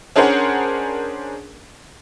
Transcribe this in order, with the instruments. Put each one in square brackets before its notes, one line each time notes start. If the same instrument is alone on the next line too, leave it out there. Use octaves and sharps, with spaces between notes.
[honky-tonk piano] C#4 D4 G#4 A#4 C5 F#5